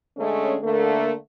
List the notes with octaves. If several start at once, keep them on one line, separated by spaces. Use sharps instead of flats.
D3 G#3 A3 C#4
D3 A3 A#3